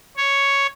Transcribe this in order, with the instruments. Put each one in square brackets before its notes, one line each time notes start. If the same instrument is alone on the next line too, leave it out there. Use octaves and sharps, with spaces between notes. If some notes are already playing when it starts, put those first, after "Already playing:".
[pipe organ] C#5